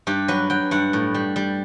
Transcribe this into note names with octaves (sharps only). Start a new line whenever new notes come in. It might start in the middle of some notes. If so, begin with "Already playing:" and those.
G2 G4
F#3 B4
F#3 G5
G2 F#5
A2
G3
G3